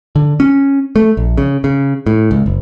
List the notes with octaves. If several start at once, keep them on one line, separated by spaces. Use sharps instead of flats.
D3
C#4
A3
A#1
C#3
C#3
A2
C#2
F#1